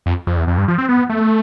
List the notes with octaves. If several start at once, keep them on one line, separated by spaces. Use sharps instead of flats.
F2
F2
E2
F2
G2
F3
C4
B3
A3